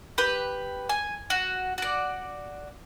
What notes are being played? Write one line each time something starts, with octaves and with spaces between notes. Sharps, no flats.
G4 B4
G#5
F#4
F#4 D5